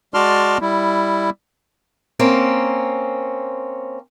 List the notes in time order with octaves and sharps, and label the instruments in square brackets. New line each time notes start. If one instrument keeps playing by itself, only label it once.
[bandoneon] G#3 F#4 D5 A5 C6 F6
G3 E4
[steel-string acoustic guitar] A#3 C4 C#4